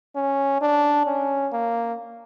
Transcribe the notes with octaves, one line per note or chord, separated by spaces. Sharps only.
C#4
D4
C#4
A#3